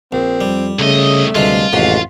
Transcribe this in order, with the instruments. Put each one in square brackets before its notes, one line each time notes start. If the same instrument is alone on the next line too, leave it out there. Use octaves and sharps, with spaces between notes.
[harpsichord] A#1 [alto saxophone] C4
[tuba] F2 [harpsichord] G3
[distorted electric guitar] C2 D#5 [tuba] C#3 [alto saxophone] A3
[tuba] D2 [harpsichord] G2 C3 G#3 [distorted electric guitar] F4
[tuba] A1 [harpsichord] F2 G#2 C3 [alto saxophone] F#4